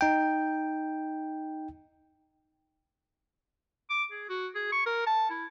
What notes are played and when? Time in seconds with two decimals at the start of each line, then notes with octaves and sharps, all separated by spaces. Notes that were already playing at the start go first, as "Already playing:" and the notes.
0.01 D#4 G5
3.90 D6
4.11 G#4
4.29 F#4
4.55 G#4
4.72 C#6
4.86 A#4
5.07 A5
5.30 E4